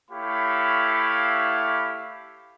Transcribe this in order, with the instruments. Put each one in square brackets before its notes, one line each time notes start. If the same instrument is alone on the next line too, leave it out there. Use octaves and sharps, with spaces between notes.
[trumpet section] A3 E4 G4 C#5 F5 B5